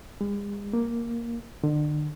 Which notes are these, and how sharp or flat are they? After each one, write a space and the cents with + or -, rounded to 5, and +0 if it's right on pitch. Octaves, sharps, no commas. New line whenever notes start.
G#3 -40
A#3 +5
D3 +35